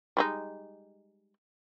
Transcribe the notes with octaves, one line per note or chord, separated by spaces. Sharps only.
G3 G#3 D#4